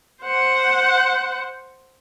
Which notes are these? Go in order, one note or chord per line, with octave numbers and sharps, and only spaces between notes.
C5 F#5